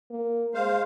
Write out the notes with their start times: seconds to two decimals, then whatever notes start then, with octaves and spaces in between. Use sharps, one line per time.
0.10 A#3
0.54 G#3 C5 F5